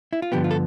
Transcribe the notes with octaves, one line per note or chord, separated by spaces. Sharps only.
E4
F4
G2 D3 F3 B3 G4
F4
A4